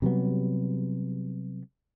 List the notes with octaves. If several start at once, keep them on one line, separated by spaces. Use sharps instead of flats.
C3 F#3 G3 B3